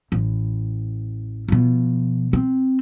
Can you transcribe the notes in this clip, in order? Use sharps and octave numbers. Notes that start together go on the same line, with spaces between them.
A1
B2 F3
C4